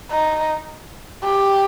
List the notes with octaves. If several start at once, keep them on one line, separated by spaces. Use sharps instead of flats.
D#4
G4